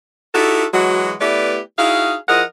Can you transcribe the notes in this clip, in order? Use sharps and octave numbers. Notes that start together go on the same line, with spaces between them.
D#4 E4 F#4 G4 A4
E3 F#3 G#3 F#4
A3 B3 E4 G4 B4 D5
D#4 E4 F#4 G#4 F5
F3 E4 G#4 A#4 D#5 F#5